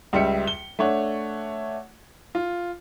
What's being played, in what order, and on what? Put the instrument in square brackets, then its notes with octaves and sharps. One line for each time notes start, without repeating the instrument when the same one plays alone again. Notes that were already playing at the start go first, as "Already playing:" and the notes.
[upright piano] C#2 G3 E5 C#7
G7
A3 D4 C#5 F#5
F4